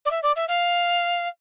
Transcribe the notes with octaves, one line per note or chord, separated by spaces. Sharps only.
D5
E5
D5
E5
F5